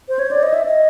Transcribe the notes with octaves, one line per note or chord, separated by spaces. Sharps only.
C5
C#5
D5
D#5
E5
D#5